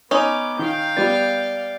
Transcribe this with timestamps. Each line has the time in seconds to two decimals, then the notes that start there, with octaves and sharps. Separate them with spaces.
0.11 B3 C#4 D#4 D6
0.59 D#3 F5 G5
0.97 G3 B3 D5 A6